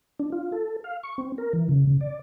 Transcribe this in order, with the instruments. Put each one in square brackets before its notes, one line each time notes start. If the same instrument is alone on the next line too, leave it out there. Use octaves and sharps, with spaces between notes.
[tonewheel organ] D4
F4
A4
F5
C#6
C4
A#4
E3
C#3
C#3
D5